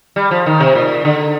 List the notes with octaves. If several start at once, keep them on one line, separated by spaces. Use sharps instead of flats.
G3
F3
D#3
C3
A#2
D3